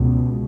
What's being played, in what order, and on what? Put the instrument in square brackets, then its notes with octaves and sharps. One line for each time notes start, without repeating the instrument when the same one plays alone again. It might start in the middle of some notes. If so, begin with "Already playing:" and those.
Already playing: [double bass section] C#2 B2